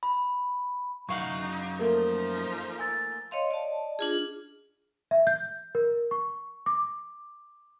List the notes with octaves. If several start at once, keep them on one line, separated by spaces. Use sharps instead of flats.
B5
F#2 D#4 F5 F#5 C#6
F3 A3 A#3 D#4 A#4
G#5 E6 A6
C#5 D#5 F5 C6
D5 D#5 A5
D4 F4 G#4
E5
G6
A#4
C#6
D6